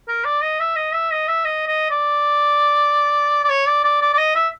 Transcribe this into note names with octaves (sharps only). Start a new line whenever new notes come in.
A#4
D5
D#5
E5
D#5
E5
D#5
E5
D#5
D#5
D5
D5
C#5
D5
D5
D5
D5
D#5
E5